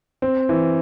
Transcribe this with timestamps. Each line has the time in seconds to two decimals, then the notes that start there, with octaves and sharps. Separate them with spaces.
0.22 C4
0.49 E3